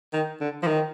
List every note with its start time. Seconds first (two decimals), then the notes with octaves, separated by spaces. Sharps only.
0.13 D#3
0.40 D3
0.63 F3
0.67 D#3